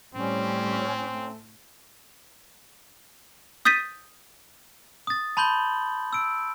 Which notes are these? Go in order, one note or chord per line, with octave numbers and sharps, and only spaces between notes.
A2 G3 C4 C#4
A3
D#6 G6 A6 B6 D#7
D#6 A6
A5 B5 C6 G6 F#7 G7
E6 D7